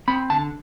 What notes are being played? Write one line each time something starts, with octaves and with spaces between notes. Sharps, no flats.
C4 B5
D3 A5